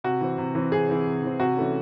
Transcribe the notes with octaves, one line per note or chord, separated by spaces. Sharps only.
C3 F#4
E3 C4
C3
E3 C4
C3 G#4
E3 C4
C3
E3 C4
C3 F#4
E3 A3 C#4